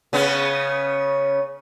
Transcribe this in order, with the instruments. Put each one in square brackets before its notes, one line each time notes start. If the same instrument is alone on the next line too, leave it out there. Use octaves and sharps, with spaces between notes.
[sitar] C#3 B3 C#4